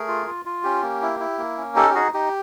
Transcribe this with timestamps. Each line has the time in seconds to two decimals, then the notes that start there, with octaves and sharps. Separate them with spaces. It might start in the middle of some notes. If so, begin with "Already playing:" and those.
Already playing: A3 G#4 A#4
0.08 F4
0.27 F4
0.45 F4
0.64 C#4 G4
0.82 A#3
1.02 E4
1.20 E4
1.38 A#3
1.57 C#4
1.76 D#4 G4 A4
1.90 G4
1.95 D#4 F#4 G#4
2.14 D#4 G4